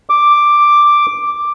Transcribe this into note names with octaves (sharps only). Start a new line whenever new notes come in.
D6